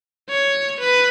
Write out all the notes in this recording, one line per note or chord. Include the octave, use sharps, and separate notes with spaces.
C#5
B4